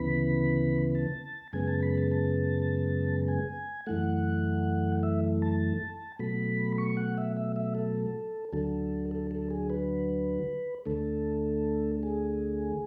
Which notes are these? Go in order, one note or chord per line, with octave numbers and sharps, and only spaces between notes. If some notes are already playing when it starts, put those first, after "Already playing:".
Already playing: D2 C#3 E3 B3 B5
A5
F#2 C#3 G#3 B3 G#5
A5
B5
A5
A5
G#5
F#2 E3 A3 F#5
E5
A5
B2 F#3 A3 B5
C#6
F#5
E5
E5
E5
A4
D2 D3 F#3 A4
A4
A4
G#4
B4
D2 D3 A3 A4
G#4